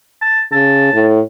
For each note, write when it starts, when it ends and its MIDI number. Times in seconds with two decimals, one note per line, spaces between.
0.22 0.42 81
0.52 0.91 49
0.52 1.05 81
0.94 1.21 45